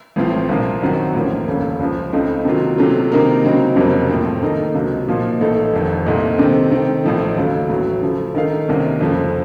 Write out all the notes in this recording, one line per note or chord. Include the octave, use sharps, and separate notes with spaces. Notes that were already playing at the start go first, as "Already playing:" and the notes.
A1 A2 F3 C4 F4
C2 A#2 F3 A#3
F#2 D#3 F#3 C4 F#4
A1 A2 F3 A#3 C#4
F1 D#2 C#3 A3 C#4
C#2 C#3 F3
C#2 C#3 A3 C4 D#4
C3 D#3 F#3 A#3 F4
C3 F#3 A3 C#4 F4
C3 D#3 A#3 D#4 A#4
C#3 F#3 C4 D#4 A#4
F#1 F2 C3 F#3 A#3
A2 F3 C4
D#3 A#3 D#4 A4 D#5
C#2 C3 F#3
A#2 F3 A#3 D#4
A1 A2 A3 D#4 A4
F1 F2 D#3
C2 A#2 A3 C4 D#4
C3 D#3 A3 C4
D#3 A3 C4
A1 A2 F3 A3 D#4
D#2 C#3 F#3 A3
A1 A2 F#3
C#3 F3 A3
D#3 A3 D#4 A#4 F5
C2 C3 D#3 A#3 C#4
F2 C#3 F3 A3